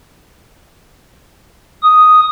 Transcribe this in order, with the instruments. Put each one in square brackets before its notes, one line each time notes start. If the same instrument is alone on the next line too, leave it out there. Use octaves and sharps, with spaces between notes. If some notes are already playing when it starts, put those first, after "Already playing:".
[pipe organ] D#6